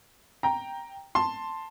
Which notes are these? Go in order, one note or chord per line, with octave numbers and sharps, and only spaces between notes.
G5 A#5
A5 C6